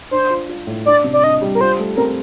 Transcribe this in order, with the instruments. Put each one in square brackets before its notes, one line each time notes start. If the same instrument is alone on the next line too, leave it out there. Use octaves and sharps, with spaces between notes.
[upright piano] D4 [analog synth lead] C5
[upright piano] F4
F4
A2
[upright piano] D4 [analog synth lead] D5
[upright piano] C3
[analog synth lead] D5
[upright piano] D4 [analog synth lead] D#5
[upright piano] G3
[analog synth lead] A#4
[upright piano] F4 [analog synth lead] C5
[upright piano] A3
[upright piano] C4 [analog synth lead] A#4